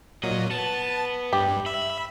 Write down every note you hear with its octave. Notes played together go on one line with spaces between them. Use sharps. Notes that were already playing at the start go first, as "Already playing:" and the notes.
A#2 F#3 D#5
B3 A5
G2 G4
E5 B5